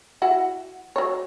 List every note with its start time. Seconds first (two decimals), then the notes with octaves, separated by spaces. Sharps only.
0.22 E4 F#4 F#5
0.96 F#3 C#5